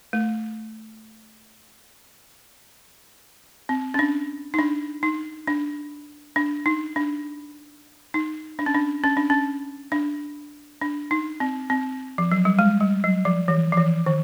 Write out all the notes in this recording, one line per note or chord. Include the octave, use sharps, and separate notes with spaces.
A3
C4
C#4
D4
D#4
D4
D#4
D4
D4
D#4
D4
D#4
D4
C#4
D4
C#4
D4
C#4
D4
D4
D#4
C4
C4
F3
F#3
G3
G#3
G3
F#3
F3
E3
F3
E3
D#3